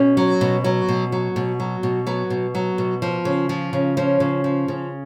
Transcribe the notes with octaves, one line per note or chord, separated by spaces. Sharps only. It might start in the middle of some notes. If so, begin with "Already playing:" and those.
Already playing: B2 C#4
F#3
B2
F#3
B2
F#3
B2
F#3
B2
F#3 B3
B2
F#3
B2
F3
C#3
F3
C#3
F3 C#4
C#3
F3
C#3